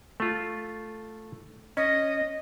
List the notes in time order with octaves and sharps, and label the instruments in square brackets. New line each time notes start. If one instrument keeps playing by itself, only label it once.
[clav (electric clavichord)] A3 F4
[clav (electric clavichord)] C#4 [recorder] D#5